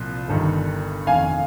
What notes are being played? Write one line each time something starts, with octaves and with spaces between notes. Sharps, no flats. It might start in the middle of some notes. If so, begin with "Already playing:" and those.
Already playing: C2 A#2 F3
G1 G2 D#3
F1 F2 D#3 F5 G#5